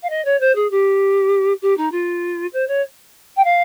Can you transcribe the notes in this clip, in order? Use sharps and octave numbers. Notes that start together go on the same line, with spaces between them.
F5
D#5
C#5
C5
G#4
G4
G4
D#4
F4
C5
C#5
G5
F5